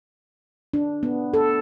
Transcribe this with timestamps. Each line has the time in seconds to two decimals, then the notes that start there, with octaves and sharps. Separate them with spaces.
0.74 D4
1.03 B3
1.34 A4